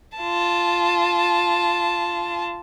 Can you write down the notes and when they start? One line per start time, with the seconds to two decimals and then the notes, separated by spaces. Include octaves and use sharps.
0.18 F4 A5